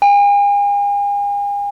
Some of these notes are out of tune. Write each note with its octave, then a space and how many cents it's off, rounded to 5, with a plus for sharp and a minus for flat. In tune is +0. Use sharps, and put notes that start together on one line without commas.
G#5 -45